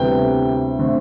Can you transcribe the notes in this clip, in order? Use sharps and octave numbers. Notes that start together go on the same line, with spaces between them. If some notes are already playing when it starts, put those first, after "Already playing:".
Already playing: D2 C3 E3 G3 B3 G5
D3 A3 C4